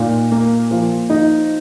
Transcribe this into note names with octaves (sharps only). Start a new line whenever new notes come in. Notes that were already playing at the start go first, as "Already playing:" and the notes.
Already playing: A#2 D#4
A#3
F3
D#4